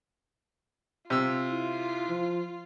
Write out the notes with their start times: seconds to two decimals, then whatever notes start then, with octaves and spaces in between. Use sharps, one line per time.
1.10 C3 F4 E6
1.50 E4
2.08 F3